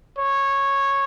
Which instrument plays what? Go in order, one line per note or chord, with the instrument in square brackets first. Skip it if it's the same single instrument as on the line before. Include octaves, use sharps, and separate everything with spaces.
[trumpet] C#5